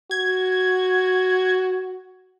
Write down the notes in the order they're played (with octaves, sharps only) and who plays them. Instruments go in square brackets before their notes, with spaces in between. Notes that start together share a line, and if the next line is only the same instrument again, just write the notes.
[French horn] F#4 [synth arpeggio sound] G#6